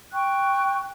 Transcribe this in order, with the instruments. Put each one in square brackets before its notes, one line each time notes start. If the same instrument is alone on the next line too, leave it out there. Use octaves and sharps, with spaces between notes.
[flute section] G5 C#6 F#6